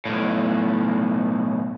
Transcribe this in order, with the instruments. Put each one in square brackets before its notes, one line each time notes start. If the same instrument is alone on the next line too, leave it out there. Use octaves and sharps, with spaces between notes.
[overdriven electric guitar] B1 A2